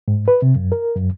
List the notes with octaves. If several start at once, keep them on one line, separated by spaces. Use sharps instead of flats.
G#2
B4
C3
F#2
A#4
F#2